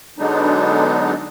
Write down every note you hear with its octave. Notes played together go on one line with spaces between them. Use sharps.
D3 F#3 G#3 B3 D4 D#4